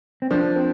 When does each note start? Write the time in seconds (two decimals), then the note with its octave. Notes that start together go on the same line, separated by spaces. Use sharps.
0.22 C4
0.31 F3 D4
0.56 C4